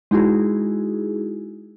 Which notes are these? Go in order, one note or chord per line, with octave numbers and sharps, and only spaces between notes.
G#3 D#4 E4 F#4 G#4